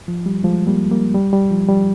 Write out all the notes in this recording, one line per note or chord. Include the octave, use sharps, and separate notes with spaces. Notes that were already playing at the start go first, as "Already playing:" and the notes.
F3
G3
F3 G#3
G3 A#3
G3 A#3
G3
G3
F3
G3